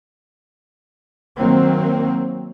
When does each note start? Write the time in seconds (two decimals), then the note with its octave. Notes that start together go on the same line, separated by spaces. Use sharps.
1.37 D#3 F#3 A#3 C4